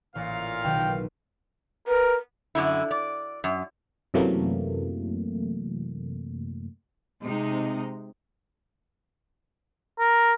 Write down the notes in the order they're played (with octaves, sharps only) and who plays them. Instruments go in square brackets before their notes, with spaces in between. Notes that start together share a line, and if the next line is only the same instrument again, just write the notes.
[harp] A1 [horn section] A#2 F5
[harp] B1 B2 D#3 [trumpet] G5
[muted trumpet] A#4 [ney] B4
[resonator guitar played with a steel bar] F#2 D3 E4
D5
F#2
[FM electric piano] F#2 C3 E3 F#3 A3 A#3
[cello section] C3 G#3 D#4
[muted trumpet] A#4